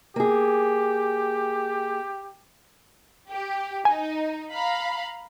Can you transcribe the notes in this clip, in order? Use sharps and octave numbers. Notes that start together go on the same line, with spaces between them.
A#3 G4 G#4
G4
D#4 G#5
F5 A#5 B5